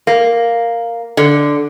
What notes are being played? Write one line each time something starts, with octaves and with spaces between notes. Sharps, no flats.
A#3
D3